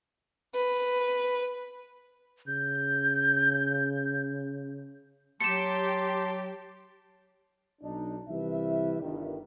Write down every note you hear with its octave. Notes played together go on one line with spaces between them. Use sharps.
B4
C#3 G6
F#3 G4 A5 C6 C#7 E7
B1 D4 D#4
C2 E3 G3 B4 E5
G1 G2 D#3